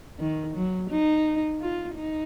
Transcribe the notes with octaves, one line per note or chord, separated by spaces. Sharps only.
D#3
F#3
D#4
F4
D#4